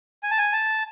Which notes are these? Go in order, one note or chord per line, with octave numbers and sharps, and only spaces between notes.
G#5
A5
G#5
A5